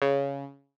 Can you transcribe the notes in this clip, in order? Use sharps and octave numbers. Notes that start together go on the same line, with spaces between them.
C#3